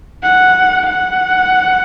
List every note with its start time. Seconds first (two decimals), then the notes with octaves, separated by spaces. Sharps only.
0.23 F#5
0.86 F#5